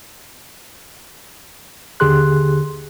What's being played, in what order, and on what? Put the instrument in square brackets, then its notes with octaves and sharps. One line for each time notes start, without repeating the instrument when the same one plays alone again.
[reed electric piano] D#2 D3 G4 G#4 C6 F#6